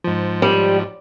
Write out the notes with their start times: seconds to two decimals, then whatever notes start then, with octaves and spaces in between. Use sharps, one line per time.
0.04 G#2 F3
0.42 G3